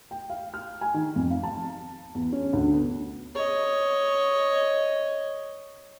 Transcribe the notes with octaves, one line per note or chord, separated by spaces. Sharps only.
G5
F5
F6
G#5
D#3
F2
F5
A5
E2
C#4
D2
B3
C#5 D#5